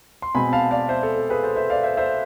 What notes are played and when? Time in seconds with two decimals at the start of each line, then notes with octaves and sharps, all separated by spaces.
0.22 C6
0.35 B2 G#3 C4 G#5 B5
0.53 F5 A5
0.71 D5 F5
0.88 C5 E5
1.03 A4
1.16 A4
1.30 G#4 B4
1.43 A4 C5
1.56 C5 E5
1.70 D5 F5
1.83 C5 E5
1.97 C5 E5